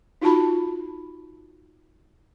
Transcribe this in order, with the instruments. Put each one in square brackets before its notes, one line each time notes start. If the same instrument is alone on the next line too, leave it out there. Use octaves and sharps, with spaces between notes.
[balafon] D#4 F4 F#4 A5 B5